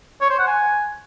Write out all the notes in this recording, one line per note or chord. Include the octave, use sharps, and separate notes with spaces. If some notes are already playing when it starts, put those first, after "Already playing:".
C#5
C5
F#5
G#5